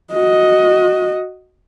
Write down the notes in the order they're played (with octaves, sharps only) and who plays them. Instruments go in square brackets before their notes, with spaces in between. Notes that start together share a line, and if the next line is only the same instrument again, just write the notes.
[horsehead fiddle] F#4 D#5